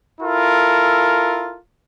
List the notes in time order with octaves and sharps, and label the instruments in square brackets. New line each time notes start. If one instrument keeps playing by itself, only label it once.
[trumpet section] E4 F4 A4 A#4